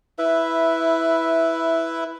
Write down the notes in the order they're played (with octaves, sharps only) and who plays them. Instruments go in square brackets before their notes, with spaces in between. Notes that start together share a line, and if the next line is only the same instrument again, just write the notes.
[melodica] E4 B4 E5